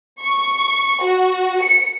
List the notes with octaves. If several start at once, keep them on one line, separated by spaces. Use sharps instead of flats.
C#6
F#4
C#7